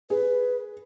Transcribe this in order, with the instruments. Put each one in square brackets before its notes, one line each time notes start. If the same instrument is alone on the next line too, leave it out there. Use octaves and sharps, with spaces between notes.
[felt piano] G#4 [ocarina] B4